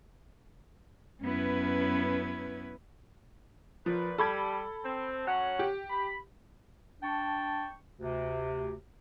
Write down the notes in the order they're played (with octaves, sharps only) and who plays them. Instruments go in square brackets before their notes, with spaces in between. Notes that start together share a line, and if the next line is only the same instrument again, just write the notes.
[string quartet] F#2 B3 C#4 E4 B4 G#6
[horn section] A#2 B4 [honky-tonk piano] F3
[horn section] G3 [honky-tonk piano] A4 B5 G#6
[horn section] C4
F#3 C#4 F#5
[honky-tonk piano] G4
[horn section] B5
[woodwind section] D4 G5 A5 C#6
D2 C3